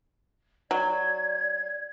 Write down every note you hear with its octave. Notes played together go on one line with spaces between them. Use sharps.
F#3 D5 G#6